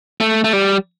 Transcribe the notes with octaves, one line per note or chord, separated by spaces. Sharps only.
A3
A3
G3